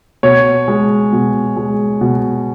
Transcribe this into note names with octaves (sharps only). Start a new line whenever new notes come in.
B2 C#5
G#3
B2
G#3
B2